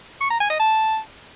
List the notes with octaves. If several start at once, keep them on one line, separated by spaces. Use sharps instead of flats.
C#6
A#5
G#5
D#5
A5